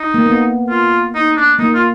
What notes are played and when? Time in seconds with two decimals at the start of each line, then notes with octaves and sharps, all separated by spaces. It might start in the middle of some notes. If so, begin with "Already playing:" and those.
Already playing: D#4
0.14 A#3
0.26 B3
0.69 F4
1.15 D#4
1.37 D4
1.59 A#3 D#4
1.74 F4